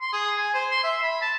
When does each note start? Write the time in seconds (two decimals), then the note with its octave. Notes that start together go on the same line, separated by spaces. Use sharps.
0.01 C6
0.13 G#4
0.37 G#5
0.54 C5
0.71 C6
0.84 E5
1.03 B5
1.22 A5